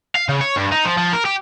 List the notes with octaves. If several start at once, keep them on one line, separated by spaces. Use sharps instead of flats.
F5
C#3
C#5
G2
D#4
F3
F3
A#4
G4